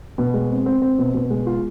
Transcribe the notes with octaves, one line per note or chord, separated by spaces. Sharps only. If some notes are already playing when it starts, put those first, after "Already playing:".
B2
G#3
C4
C4
C4
B2
B2
G#3
F4